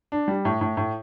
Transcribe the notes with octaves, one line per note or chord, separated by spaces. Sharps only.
D4
G3
A2
A2
A2